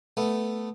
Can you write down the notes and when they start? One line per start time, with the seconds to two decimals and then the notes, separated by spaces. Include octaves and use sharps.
0.17 A3 B3